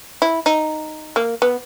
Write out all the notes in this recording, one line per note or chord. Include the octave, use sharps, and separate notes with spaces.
E4
D#4
A#3
B3